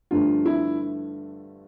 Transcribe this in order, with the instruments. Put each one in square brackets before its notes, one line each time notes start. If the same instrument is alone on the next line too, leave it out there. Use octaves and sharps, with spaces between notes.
[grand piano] G2 D3 F3 A3 F4
E4